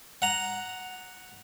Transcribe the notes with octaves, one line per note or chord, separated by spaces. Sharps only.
F#5 A#5